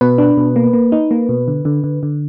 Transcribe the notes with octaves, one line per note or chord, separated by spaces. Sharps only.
B2 B4
D4
B2
A#3
A#3
D#4
A#3
B2
D3
D3
D3
D3